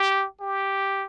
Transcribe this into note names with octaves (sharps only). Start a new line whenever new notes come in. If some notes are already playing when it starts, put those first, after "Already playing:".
Already playing: G4
G4